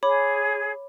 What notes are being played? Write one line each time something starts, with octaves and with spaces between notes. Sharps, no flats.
G#4 C#5 B5 D6